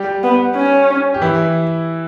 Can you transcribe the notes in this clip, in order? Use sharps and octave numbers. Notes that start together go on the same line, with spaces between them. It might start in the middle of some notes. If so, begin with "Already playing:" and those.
Already playing: G3 G4
B3
C#4
G4
E3 E4